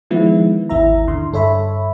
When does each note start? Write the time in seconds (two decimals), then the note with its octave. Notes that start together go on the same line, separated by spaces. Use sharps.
0.11 D#3 F3 G#3 B3 E4
0.69 G#1 D#2 E4 E5 A#5
1.07 D3 C6
1.33 G2 A4 C#5 E5 B5